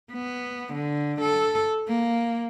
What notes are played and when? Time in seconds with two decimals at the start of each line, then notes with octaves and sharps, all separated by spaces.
0.12 B3
0.73 D3
1.21 A4
1.87 A#3